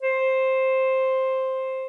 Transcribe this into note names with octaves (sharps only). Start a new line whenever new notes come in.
C5